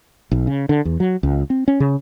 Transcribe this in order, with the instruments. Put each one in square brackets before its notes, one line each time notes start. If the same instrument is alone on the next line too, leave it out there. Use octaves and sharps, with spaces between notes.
[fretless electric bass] B1
C#3
D3
E2
F#3
C#2
C4
C#4
C#3